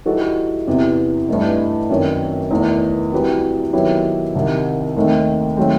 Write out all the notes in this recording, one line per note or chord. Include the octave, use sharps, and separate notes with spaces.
E3 G3 D#4 F#4 A4
E2 C3 E3 B3
G2 E3 A3 D#4
F#2 D#3 F#3 C4
E2 D#3 A3
E3 G3 C4 F#4 B4
D#3 F#3 B3 E4 G4
C2 C3 D#3
D#2 D#3 A3 C4 D#4
D#3 F#3 A3 C4